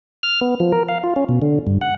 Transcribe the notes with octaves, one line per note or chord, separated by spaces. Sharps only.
F6
B3
F3
A#4
F5
F4
C#4
B2
D3
G2
F#5